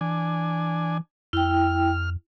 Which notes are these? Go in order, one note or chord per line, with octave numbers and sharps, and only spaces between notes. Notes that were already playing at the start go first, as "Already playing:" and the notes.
E3 D4 G#5
F2 E4 G5 F6